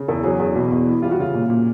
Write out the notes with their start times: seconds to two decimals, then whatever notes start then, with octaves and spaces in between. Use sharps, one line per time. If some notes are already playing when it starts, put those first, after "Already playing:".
Already playing: C#3
0.08 E2 A4
0.24 F#3 G#4
0.39 E2
0.55 B2
0.72 E2
0.87 E3
1.02 G3 F4
1.11 F#4
1.19 C#3 F4
1.34 A#2
1.50 A#2